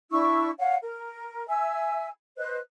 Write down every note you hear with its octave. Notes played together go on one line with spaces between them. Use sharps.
D4 E4 C#6 E6
C#5 F5 F#5
A#4
E5 G#5 E6
B4 C5 D#5 F#6